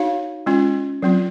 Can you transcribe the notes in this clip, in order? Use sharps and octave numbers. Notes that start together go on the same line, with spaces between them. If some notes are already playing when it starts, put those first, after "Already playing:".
Already playing: D#4 F#4 C#5 F5
G#3 C#4 F4
F#3 C4 F4